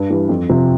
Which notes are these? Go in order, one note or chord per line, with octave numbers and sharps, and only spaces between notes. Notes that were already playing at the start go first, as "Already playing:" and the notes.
Already playing: G2
E3 G3
F2
C3 F3 C4